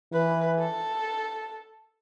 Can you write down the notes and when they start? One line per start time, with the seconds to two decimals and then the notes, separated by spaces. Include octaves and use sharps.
0.13 E3 B4
0.59 A4